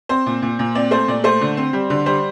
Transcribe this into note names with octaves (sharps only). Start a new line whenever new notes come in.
C4 C5
A#2
A#2
A#2
C4 D5
A3 C5
A#2 D5
A3 C5
D3
C4
G3
D3
G3 C5